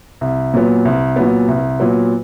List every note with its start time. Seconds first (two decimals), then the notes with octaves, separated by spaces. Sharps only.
0.21 C2
0.54 A#2 F#3 B3
0.85 C2
1.16 A#2 F#3 B3
1.48 C2
1.80 A#2 F#3 B3